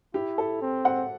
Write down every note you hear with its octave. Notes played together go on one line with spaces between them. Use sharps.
E4 G4
A4
C4
F#5